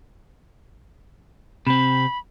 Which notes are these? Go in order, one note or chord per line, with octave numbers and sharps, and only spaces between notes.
C3 C4 B5